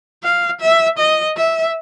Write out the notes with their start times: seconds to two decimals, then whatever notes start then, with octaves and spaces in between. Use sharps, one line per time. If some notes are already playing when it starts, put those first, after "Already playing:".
0.23 F5
0.61 E5
0.98 D#5
1.37 E5